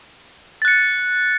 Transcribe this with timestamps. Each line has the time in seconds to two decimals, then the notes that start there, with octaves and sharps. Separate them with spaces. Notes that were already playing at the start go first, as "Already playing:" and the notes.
0.62 A6
0.65 F#6
0.68 C#7